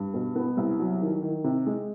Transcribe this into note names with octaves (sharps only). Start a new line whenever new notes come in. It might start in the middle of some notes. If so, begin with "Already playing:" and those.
Already playing: G2
B2
B3
C2
F#3
D#3
D#3
C3
G#3